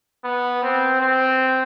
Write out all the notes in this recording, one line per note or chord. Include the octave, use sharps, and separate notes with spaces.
B3
C4
C4